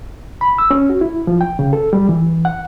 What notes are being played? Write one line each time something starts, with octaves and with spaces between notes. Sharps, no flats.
B5
E6
C#4
F#4
E4
F3
G5
C#3
A4
G3
E3
F#5